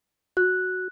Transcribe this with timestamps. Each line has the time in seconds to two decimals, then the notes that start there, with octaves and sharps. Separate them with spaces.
0.37 F#4 F#6